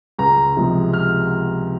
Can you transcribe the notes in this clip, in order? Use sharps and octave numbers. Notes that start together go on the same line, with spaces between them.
C#2 A#5
C3 F3 G#3
F6